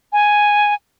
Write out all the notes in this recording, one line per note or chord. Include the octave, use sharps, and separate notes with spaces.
G#5